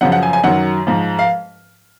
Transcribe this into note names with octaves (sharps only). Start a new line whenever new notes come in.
F#2 C#3 F3 F#5
F#5
G#5
G#5
F#2 D#3 F#3 F#5
G#2 F3
F5